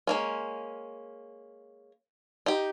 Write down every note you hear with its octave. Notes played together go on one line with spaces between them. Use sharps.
G#3 A#3 C#4
D#4 G4